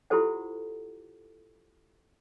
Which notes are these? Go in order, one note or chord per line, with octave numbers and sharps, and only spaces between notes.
E4 F4 G4 A4 C5 F#5